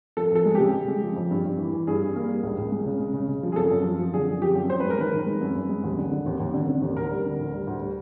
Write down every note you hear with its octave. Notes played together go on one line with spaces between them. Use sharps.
F3 A4
F2 A4
G#3
C#3 G4
C#3
G#3
F3
F2
G2
G2
E3
E3
G2 G#4
G3
A#3
G3
C#2
C#2
G#3
C#3
G#3
C#3
C#3
F3
G#4
F#2 A4
F#2
F3
F3
D3 G#4
F#2
F3 G4
F#2
F#2 C5
G#3 B4
A#4
D#3 B4
D#3
G#3
F#2
F#2
G#3
D#2
D3
D3
D#2
D#2
D3
D3
D#2
D2 A#4
G3
D3
D2
G3
D2
G3